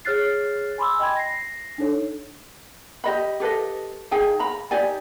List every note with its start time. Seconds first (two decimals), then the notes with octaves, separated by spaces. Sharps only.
0.05 G#4 C#5 F6 F#6 A6 C7
0.78 G#5 B5 C6 D6 E6
0.99 D#5 G5 B5 G#6
1.16 A#6 C7
1.78 D4 D#4 A4 C#5
3.04 G4 D#5 B5
3.40 G4 A4 B4 D#5
4.11 D#4 G#4 G5 G#5
4.39 A#5 B5
4.71 D#4 G4 D5 G#5